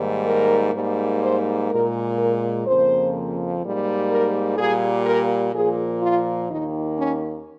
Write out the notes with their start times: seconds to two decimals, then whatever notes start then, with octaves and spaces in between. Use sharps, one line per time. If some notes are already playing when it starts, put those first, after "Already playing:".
Already playing: G#2 D#3 G3 A#3
0.27 A#4
0.74 G#2 G3 A#3
1.22 C5
1.70 A#2 G#3 A#4
2.18 A#4
2.66 F2 C#3 F3 A#3 C5
3.63 G#2 G3 A#3
4.10 A#4
4.58 A#2 G3 A#3 G#4
5.06 A#4
5.54 A#2 F3 A#3 G#4
6.02 F4
6.50 D#2 D#3 A#3 D#4
6.98 C#4